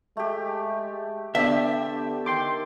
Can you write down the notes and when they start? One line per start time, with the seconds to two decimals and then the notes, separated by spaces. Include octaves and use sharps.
0.17 G#3 A3 G4
1.35 D3 B3 D4 G4 A4 E5
2.26 D#3 C5 G5 C6 D6